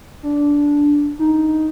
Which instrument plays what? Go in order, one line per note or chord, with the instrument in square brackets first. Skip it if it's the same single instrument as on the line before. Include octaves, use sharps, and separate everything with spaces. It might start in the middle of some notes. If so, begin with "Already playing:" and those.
[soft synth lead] D4
D#4